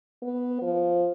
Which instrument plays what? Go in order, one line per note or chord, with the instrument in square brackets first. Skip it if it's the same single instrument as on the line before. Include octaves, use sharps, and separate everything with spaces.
[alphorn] B3
F3